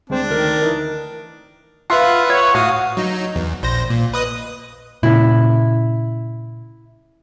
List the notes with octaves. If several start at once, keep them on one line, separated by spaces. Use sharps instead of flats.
D2 G#3 C4 D4 C5
D2 D#3 A#4
E3 D#4
F4 B4 E5 F#5
C#5
A2 F#4 F5 D#6
F#3 D#4
E2
A#1 C5 A#6
A#2
B4 D#5 D#6
A#2 C#3 E4